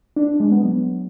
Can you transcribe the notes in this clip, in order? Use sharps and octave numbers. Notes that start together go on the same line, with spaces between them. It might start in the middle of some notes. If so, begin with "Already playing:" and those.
D4
D4
G#3
B3
F#3